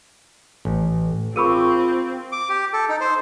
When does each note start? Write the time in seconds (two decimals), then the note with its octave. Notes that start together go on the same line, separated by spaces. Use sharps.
0.65 A1
1.36 C4 F4 G#4 A#4 B5 C#6 E6 D#7
2.32 D6
2.49 G4
2.73 A4
2.89 D#4
3.01 C5